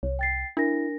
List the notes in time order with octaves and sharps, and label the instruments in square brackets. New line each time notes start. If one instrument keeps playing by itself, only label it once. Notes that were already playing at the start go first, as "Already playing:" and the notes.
[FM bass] C2 [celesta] C#5
[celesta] G5 A6 C7
[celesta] D4 A#4 A#6 [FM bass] E4